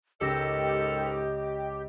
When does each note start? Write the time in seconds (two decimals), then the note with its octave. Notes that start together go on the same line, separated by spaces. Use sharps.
0.21 C#2 G#2 G4 A4 A#4 D#5 E6 A#6